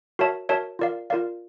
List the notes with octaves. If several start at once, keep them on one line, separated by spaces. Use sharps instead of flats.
F#4 A#4 C#5 E5 A5
F#4 A#4 C#5 E5 A5
F4 A#4 D5 F5
F4 A#4 D5 F5